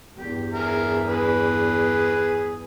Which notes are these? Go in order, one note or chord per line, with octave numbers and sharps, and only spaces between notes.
E2 G2 G4
G#4 A#4 E5
G#4 B4